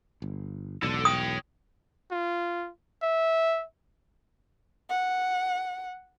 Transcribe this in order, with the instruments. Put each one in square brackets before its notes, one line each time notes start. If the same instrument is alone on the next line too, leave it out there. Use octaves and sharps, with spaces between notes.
[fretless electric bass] G1
[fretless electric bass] E1 B1 [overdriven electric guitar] A4 D5
[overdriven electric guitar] C#5 G5 [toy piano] D#6
[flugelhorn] F4
E5
[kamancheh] F#5